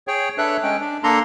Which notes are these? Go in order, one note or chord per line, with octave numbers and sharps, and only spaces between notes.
G#4 C#5 G5
D4 A4 B4 C#5 E5 F#6
G#3 C#4 G5
D4
A#3 D4 A4 A#5 C6